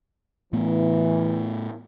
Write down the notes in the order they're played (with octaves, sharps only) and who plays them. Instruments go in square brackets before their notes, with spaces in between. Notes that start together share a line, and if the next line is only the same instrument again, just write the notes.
[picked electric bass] A2 A3 B3 [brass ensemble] E3